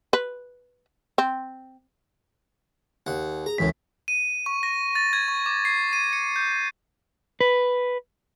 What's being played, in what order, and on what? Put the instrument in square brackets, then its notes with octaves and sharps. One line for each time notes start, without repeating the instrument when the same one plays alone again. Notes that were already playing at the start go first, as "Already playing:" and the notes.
[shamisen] B4
C4
[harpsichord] D#2 F#5
[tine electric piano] G#4 [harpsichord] A#5
[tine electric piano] C#2 E3 B6 [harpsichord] F#2 A2
[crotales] D#7
C#6
A#6
A6
G#6
C#6
D6
C7
D#7
C#7
G6
[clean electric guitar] B4